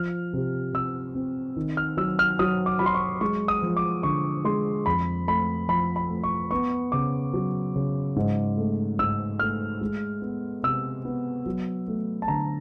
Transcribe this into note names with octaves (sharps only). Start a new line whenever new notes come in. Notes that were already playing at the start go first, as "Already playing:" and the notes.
Already playing: F3 F6
C3
C3 E6
C4
D#3
F6
F#3 E6
F6
F#3 D#6
D6
F#3 B5
C6
C#6
G#3 C#6
D#6
F3
D6
D3 C#6
G#3 C6
F2 B5
A3 B5
F3 B5
B5
A3
C#6
B3 C#6
C#3 D6
F#3
C#3
G#2
A3
G#2 E6
A3 F6
G#3
B3
C3 E6
B3
F#3
A3
A5
D3 A#5